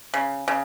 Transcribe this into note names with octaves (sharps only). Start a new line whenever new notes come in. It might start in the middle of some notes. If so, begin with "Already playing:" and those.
C#3
C#3